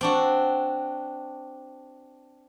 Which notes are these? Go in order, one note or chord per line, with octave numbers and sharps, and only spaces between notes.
C4 D4 F#4